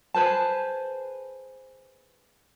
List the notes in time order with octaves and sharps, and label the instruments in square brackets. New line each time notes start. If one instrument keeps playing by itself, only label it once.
[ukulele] G#4 B4 C5 A5